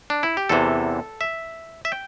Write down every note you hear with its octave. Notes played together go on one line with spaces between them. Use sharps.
D4
E4
G4
E2 C3 E3 A4
E5
E5
G5